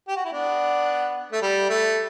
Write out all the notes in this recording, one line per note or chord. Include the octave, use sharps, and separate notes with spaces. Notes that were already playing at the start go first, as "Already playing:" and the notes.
G4
F#4
E4
B3 D4
A3
G3
A3